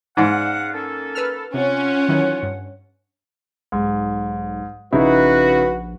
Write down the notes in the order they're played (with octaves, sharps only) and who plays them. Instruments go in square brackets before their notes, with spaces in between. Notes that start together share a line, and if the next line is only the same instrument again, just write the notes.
[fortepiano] G#2 [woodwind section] C#3 F5 F#5 [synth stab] D5
[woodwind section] A#3 C#4 A4
[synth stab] B4 E6 F6
[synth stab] C3 [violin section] C#4 [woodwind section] F4 F#5
[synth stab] D#3 E3 F#3
G2
[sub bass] B1 [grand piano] G#2
[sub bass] A#1 [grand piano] C#3 D#4 E4 [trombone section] F#4 B4